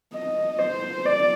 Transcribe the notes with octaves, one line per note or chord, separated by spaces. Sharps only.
D#5
C5
D5